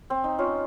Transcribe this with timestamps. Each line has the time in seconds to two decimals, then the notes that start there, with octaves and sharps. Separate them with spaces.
0.10 C4
0.24 D#4
0.38 C#4 F4